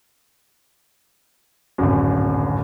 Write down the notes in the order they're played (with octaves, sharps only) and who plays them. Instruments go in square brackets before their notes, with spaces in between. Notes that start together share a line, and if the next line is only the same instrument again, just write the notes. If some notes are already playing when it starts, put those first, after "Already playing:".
[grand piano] D1 G#1 F#2